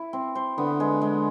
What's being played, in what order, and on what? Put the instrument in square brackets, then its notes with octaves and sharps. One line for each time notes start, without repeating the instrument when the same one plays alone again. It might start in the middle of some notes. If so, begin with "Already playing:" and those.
Already playing: [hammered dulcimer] E4
C4
C5
[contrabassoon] D3 [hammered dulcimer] B3
[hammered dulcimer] G#3
G#3